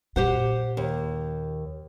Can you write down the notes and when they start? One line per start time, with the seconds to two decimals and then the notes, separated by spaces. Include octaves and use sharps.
0.16 A#2 G4 C5 F#5
0.77 D#2